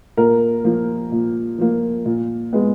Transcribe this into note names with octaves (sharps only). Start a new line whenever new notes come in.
A#2 A#4
F3 A#3
A#2
F3 A#3
A#2
G#3 B3